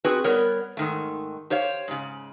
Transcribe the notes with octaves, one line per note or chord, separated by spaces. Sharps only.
C4 F#4 G#4 B4
G3 B3 A#4 C#5
G#2 D#3 A3
G4 C5 C#5 F5
G#2 C#3